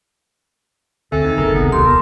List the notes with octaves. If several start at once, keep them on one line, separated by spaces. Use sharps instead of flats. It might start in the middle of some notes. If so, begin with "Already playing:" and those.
D2 D3 C4 A4 E5 G#5
D#4
F#1 C#3 G#4 A#4 A#5
C2 C3 D#3 B3
D#1 C2 G4 C6
A#4 A5